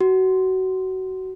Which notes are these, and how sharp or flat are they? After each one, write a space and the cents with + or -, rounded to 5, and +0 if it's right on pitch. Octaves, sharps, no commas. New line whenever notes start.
F#4 +25